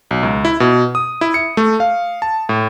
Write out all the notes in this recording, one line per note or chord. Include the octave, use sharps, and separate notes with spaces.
B1
C#2
E4
B2
D#6
E4
C#7
A3
F5
A5
A2